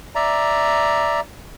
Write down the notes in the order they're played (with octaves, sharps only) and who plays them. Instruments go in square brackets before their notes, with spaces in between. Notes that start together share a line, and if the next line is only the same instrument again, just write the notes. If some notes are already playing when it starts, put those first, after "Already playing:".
[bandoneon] D5 E5 A#5